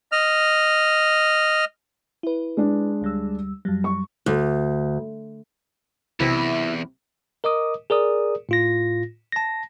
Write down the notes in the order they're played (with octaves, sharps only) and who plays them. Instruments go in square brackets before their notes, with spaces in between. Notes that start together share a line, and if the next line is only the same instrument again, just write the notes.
[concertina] D#5 F6
[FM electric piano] E4 B4
[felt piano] G#3 D4
[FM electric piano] D2 G3 E6
F#2 F#3 G3
[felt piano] C#6
[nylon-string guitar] D2
[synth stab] B1 C3 [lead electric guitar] E2 [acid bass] E4
[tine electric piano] A#4 D#5 D6 D#6
G#4 A#4 D5 D#6
A2 F4 A#6
A5 A#6